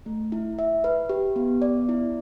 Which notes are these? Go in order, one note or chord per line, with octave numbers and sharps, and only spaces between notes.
A3
E4
E5
B4
G4
B3
D5
E4